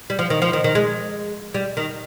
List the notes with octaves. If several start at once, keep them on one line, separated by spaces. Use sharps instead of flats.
G3
F3
D#3
F3
D#3
D#3
G#3
G3
D#3